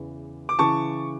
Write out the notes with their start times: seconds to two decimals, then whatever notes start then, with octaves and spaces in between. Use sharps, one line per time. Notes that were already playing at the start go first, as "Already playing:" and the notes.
Already playing: E2 C#3 E3
0.49 D6
0.59 C#3 E3 A5 C#6